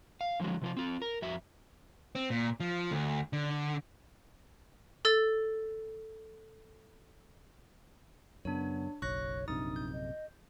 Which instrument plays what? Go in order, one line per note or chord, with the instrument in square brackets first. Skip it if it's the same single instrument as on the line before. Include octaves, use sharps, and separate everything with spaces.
[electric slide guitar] F5
D3 F3 F#3 G#3
C3 F3 E4 F4
C4 F4
A#4
F2 F#4 E5
[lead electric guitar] C4
A#2
F3
D2
D3
[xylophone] A4 E6 A6
[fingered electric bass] F#2 C#3 [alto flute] B3 [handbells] D4 C#5
[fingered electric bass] F#1 B1 [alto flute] C#5 [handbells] C#6 F#6 A#6
[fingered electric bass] A#1 F#2 C3 [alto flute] D4 [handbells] D#4 D#6
[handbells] G6
[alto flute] D#5